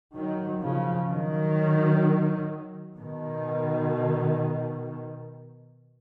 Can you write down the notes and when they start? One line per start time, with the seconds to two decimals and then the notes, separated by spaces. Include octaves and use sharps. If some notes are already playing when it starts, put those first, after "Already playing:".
0.15 D#3 F#3
0.61 C#3 F3
1.08 D#3 F#3
2.97 B2 D#3